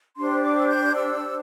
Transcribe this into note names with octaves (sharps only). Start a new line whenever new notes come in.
D4 G4 C5 C6
D6
E6
G6
E6